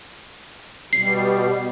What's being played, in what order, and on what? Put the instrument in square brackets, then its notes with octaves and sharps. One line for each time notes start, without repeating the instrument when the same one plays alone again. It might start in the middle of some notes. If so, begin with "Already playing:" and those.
[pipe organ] B2 G3 [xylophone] C7